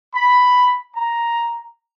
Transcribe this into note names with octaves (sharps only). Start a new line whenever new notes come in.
B5
A#5